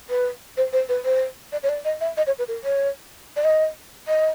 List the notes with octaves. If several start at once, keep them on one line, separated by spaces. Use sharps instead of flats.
B4
C5
C5
B4
C5
D5
C#5
D5
D#5
E5
D#5
C#5
B4
A#4
C#5
D5
D#5
D#5